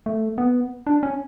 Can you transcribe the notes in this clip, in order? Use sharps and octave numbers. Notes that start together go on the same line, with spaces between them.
A3
B3
D4
C#4